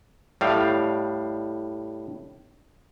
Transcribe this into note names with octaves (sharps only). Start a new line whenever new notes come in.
A2 G3 F5